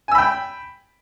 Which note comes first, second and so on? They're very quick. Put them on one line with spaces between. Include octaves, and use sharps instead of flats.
G#5 E6 B5 G5